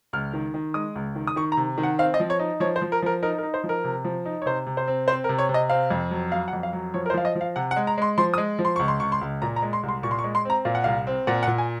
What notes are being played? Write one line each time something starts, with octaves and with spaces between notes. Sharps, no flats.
C#2 F6
D#3
D#3
G#3 D#6
C#2
D#3
D#6
D#3 C#6
A#5
C3
D#3
F#5
C4 F5
D#5
F3
C#5
D#4
F3 C#5
C5
F3
A#4
F3 A#4
D#4 A#4
A#4
D#4
C5
F3
A#4
C3
F3
D#4
C#5
C3 C5
C3
C5
C4
C4 C5
A#4
C3
C#5
C3
D#5
C4 F5
F2
F#3
F#3 F5
F#5
F2
F5
F#3
F3 C#5
A#4
C5
F3 F5
D#5
F3
F5
C3 F#5
F#5
G#3
A#5
G#3 C6
F3 C6
D#6
G#3
F3
C6
C#2 C#6
C6
C#2 C#6
C6
C#2
A#2 A#5
A#5
G#3
C6
C2
C6
A#2 C#6
C6
C#6
G#3
C6
C4 A#5
A#2 F5
F#5
C2 F5
C4
A#2 F#5
F#5
A#2
G#5